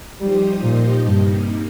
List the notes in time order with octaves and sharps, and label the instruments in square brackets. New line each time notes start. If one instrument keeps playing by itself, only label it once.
[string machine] F3 D#4 G4 C5 D#5 [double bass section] G3
[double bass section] A#2
[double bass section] G2 [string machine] C3 G3 A#3 D#4